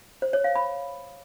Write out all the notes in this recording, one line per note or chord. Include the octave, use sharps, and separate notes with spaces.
C5
C#5
F5
B5